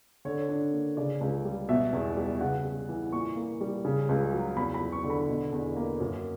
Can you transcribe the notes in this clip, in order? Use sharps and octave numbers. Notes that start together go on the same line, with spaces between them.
D3 C#5
D4
A#3
C#3 D5
C#2
G3
B2 E5
E2
G3
C#3 F#5
G3
E3
A#2 C#6
A#3
G3
C#3
C#2
F#3
E2 B5
B5
F#3
C#6
D3
B5
B2
E2
A#3
F#2